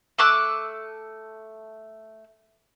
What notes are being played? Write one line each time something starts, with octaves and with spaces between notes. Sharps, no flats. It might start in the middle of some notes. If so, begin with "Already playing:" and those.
A3 D6 E6 F#6